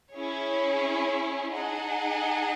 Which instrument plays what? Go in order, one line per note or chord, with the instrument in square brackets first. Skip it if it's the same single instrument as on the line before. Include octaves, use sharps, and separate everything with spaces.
[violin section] C#4 E4 G#4 C#5
D#4 G#4 D#5 F#5 A5